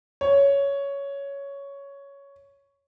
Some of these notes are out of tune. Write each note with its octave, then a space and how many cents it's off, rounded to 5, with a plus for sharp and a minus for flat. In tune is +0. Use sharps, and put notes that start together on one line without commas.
C#5 +10